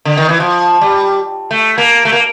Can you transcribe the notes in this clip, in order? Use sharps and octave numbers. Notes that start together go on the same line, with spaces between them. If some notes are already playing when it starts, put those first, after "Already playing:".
D3
D#3
E3
F3
G3
A3
A#3
A3
A#3